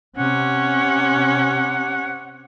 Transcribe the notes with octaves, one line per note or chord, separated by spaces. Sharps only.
C3 C#4 F#5